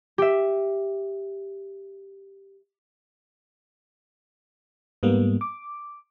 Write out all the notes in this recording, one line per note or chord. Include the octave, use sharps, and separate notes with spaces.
G4 E5
G#2 G3 A#3 B3
D6